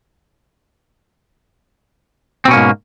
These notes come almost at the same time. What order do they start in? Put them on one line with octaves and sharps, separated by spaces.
C4 B2 C#4 A#3 G#2